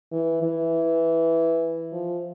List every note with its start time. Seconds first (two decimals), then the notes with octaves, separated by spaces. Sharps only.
0.12 E3
0.42 E3
1.92 F3